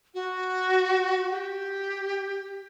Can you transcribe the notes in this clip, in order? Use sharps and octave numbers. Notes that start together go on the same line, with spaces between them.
F#4
G4